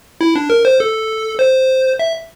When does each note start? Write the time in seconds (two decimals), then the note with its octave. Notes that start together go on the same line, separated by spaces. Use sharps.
0.21 E4
0.36 D4
0.50 A#4
0.65 C5
0.80 A4
1.39 C5
1.99 E5